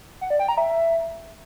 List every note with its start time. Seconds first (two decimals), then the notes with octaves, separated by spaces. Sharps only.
0.21 F#5
0.30 D5
0.39 G5
0.48 A#5
0.58 E5